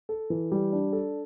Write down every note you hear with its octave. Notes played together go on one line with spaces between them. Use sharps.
A4
E3
G3
D4
A4